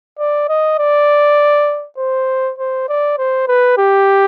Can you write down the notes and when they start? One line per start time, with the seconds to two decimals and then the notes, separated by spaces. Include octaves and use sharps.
0.19 D5
0.49 D#5
0.79 D5
1.98 C5
2.59 C5
2.89 D5
3.18 C5
3.48 B4
3.78 G4